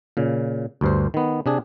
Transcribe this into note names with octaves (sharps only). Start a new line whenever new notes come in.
A#2 C#3
D2 G2 C5
D#3 B3
C3 D4 G#4